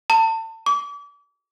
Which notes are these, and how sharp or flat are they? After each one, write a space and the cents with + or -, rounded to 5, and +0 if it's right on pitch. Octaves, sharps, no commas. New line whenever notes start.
A5 +35
D6 -35